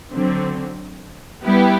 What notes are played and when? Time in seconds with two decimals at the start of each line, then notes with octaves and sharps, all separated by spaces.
0.13 D3 F#3 C4
1.43 G3 B3 E4 G4